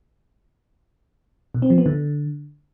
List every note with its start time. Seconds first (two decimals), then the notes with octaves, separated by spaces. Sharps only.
1.55 B2
1.62 C4
1.70 F3
1.78 B3
1.86 D3